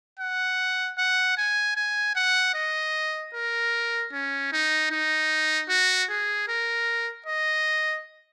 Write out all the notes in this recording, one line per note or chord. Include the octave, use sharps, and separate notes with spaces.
F#5
F#5
G#5
G#5
F#5
D#5
A#4
C#4
D#4
D#4
F#4
G#4
A#4
D#5